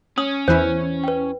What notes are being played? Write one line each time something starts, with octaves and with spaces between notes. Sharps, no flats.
C#4 D#6 F#7
E2 E3 E4 C5 G#5 G6
B4 G5